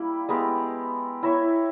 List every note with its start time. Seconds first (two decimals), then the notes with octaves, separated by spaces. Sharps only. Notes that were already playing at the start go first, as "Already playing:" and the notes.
Already playing: G3 A#3 E4
0.29 G#3 B3 G4 A#4
1.23 E4 A#4 C#5 E5